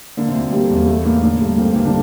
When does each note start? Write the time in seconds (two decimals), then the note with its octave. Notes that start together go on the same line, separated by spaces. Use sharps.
0.17 D3 A#3
0.28 C3 C4
0.34 D2
0.52 G3 A#3
0.63 A3
0.70 E2
0.76 A#3
0.88 A3
1.05 A2 A#3
1.23 D3 A#3
1.41 G2 A3
1.58 A#3 C4
1.68 A3
1.76 G1 A#3
1.85 D3 D4